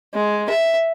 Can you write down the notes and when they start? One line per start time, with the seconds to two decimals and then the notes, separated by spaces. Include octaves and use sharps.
0.14 G#3
0.50 E5